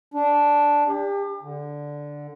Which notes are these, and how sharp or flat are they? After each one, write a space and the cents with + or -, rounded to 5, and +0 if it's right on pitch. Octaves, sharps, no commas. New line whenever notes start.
D4 -5
G4 +35
D3 -5